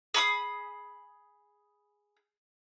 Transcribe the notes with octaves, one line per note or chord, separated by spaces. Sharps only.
G#4 B5 C#6 D#6